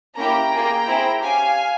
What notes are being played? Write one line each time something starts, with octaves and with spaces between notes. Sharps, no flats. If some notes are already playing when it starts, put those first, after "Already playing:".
A#3 C#4 E4 G4 G5 A#5
A#3 F4 G#4
C4 E4 G#4
C#4 G4 F5 G#5